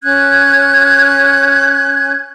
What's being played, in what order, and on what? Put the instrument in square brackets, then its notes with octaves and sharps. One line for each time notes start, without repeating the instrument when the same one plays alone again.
[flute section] C#4 F#6 G#6